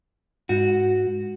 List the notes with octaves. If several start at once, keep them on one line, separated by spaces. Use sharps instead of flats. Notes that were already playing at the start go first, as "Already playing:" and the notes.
G#2 F#4